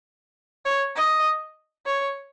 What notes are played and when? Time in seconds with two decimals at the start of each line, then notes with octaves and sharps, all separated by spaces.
0.65 C#5
0.96 D#5
1.86 C#5